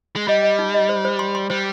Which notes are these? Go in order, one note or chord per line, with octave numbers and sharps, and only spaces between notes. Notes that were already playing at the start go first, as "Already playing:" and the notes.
G#3
G3 D#5
D#5
D#4
D#5
C5
C5
C6
C6
G3 C5